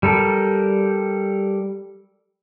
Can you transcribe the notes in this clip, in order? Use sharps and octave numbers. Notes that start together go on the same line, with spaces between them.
G3 A4 A#4